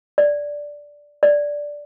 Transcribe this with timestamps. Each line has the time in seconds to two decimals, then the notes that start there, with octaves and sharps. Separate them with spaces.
0.18 D5
1.23 D5